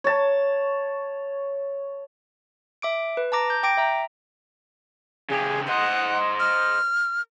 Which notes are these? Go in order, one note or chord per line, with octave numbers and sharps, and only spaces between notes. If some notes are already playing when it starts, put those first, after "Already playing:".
C#5 A5
E5 D6 D7
B4
A5 A#5 D6 A#6
G6
G5 D6 A#6 D7
E5 A#5
C#3 G4 G#4
C5 D#5 F#5
F6